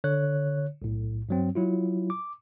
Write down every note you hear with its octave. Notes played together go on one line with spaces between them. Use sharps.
D3 C#5 F#6
B1 A2
G2 F#3 C4
F#3 E4 F4
D6